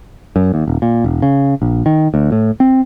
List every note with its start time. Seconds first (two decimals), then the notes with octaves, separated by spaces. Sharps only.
0.36 F#2
0.54 D#2
0.68 D#1
0.82 A#2
1.04 E1
1.22 C#3
1.62 A#1
1.86 D#3
2.14 D2
2.32 A2
2.60 C4